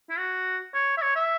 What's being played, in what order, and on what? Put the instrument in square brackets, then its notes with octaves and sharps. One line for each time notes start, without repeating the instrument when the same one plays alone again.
[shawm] E4
F#4
C#5
E5
C#5
E5